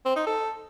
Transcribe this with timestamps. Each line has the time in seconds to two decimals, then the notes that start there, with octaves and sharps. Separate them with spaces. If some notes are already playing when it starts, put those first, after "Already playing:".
0.05 C4
0.16 D#4
0.27 A4